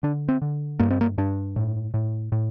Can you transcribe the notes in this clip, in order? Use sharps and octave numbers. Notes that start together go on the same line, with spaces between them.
D3 D4
C4
D3
G2 A#3
C4
A#3
G2 D4
A2
A2
A2